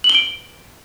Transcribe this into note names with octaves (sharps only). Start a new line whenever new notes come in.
F#7
G7
D7